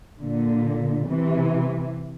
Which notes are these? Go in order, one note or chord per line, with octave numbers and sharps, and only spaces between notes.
A#2 D3
C3 E3